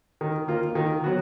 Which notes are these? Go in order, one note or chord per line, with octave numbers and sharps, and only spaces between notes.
D#3
A#3 F4
D#3
F#3 B3 F#4